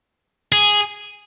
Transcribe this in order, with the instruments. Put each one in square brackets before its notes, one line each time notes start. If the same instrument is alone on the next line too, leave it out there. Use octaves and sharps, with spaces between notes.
[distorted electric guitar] G#4